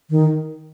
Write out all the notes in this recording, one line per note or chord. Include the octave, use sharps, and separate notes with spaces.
D#3